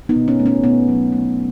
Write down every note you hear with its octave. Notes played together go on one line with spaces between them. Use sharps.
B3 D#4
B2
C#4
A3
C#4
B2 B3
F#3
A3